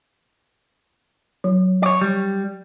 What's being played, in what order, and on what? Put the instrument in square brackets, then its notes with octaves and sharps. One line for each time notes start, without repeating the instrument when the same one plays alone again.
[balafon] F#3
[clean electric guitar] C#5 D5
G3